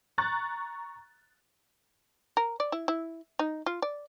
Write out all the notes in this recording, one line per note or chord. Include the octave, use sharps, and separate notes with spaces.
A#5 C#6 F#6 A6
A#4
D5
E4
E4
D#4
F4
D5